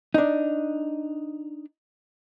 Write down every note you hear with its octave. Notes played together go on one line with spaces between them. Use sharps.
D4 D#4